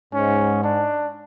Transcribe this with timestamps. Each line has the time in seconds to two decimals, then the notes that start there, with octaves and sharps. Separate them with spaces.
0.13 G#2 C#4
0.63 D4